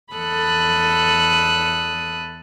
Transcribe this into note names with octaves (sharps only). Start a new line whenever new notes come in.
E2 A4 B5 D#6 F#6